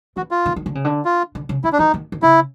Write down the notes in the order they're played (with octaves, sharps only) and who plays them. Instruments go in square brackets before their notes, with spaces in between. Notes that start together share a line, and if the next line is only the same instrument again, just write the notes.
[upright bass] E3 [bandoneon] F#4
[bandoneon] F4
[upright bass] D#3
D#3
D3
C#3
D3
[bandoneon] F4
[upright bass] D3
C#3
[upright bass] D3 [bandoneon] E4
[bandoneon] D4
[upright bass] E3 [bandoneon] D#4
[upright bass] D#3
D#3
[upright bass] C#3 [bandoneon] E4